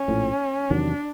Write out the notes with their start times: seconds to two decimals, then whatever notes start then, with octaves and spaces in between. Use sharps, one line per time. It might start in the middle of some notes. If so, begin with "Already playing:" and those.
Already playing: C#4
0.08 A#1 A2 F3
0.70 E2 C3 D#3 F#3 D4